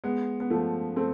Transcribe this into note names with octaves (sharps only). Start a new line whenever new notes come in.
G#3 B3
B3
F3 A3
A3 C4